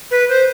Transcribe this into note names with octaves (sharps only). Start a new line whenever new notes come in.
B4
C5